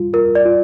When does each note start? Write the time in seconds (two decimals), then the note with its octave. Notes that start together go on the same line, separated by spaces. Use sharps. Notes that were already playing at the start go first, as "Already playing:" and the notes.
Already playing: G3 F4
0.13 F4 A#4
0.35 D5
0.45 F4